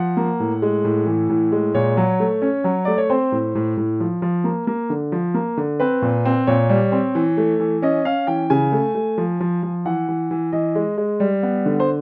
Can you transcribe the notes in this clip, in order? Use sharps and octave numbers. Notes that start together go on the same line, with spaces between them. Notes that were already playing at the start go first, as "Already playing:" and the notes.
Already playing: F3 F#5
A#3
A2
G#3
A2
E3
A2
G#3
A#2 C#5
F#3
A3
C#4
F#3
A3 D5
C#5
C4 C5
A2
A2
A2
F3
F3
A#3
A#3
D3
F3
A#3
D3
C4 B4
A#2
C4
A#2 C#5
G3
C4
E3
A3
E3
C#4 D#5
C#4 F5
E3 G5
C#3 G#5
A3
A3
F3
F3
F3
E3 F#5
E3
E3
E3 D#5
G#3
G#3
G3
B3
D3
C5